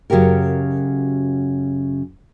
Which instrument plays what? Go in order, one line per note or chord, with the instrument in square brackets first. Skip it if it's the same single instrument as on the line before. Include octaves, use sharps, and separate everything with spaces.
[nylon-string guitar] F#2 C#3 F#4 G4 A#4